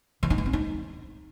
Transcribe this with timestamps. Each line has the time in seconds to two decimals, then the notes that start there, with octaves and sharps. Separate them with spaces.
0.23 E3
0.30 D#4
0.38 E3
0.46 C4
0.53 D#4